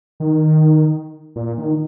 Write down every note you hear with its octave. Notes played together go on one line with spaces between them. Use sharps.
D#3
A#2
D#3